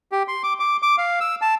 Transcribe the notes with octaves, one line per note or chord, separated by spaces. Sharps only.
G4
C6
D6
D6
D6
F5
E6
A5